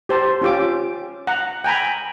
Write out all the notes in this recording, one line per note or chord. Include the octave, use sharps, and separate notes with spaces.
G4 C5 A5
C#4 F4 G4 D6
F#5 A#5
G5 G#5 A#5 B5